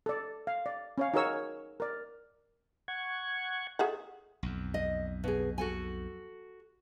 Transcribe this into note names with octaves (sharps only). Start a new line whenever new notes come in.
A4 D5
F5
D5
C#4 C#5 F5
D#4 F#4 G#4 A#4 C#5 E6
A#4 D5
F#5 C#6 G#6
G#4 A4 E5 F#5
B1 F2
D#5
B2 G#4
F#4 A4 G#5